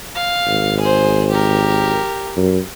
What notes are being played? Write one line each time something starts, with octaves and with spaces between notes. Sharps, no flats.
F5
G#1
G#4 C5
G4 A#4
F#2